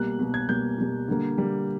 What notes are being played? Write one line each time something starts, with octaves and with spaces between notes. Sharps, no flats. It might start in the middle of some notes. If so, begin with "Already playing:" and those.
Already playing: B2 G3 A#3 F#6
B2 G3 A#3
G#6
B2 G3 A#3 G6
B2 G3 A#3
D3 G3 A#3
D3 G3 A#3